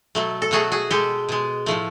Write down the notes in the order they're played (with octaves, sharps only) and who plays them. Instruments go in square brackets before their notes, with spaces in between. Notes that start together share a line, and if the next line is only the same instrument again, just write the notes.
[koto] B2 F#3 A3
A4
B2 F#3 A3 F#4 G#4
F#4 G#4
B2 G#3 G4 A4
B2 G#3
A2 F3 A3